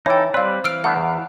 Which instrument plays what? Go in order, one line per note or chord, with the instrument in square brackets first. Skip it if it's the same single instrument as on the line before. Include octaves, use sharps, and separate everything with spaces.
[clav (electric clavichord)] E3 [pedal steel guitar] D#4 A4 [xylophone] C#5 G5
[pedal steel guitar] G3 B4 [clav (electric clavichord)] C4 [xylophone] D5 F5
[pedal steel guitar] E3 F5 [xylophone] E6 F6 D7
[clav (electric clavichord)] A3 B3 D4 [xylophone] F#5
[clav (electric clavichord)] E2